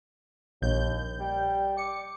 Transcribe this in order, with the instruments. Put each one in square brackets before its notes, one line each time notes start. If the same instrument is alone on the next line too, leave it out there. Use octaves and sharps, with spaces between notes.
[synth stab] A#1 G6 [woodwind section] D#2
[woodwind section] G3 G5
[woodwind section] D6 [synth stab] C#7